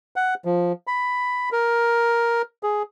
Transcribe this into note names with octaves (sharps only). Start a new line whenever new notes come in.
F#5
F3
B5
A#4
G#4